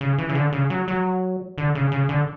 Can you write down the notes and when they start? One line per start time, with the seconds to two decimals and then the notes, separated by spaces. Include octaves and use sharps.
0.01 C#3
0.18 E3
0.29 C#3
0.35 D3
0.53 C#3
0.70 F#3
0.88 F#3
1.58 D3
1.75 C#3
1.92 C#3
2.09 D3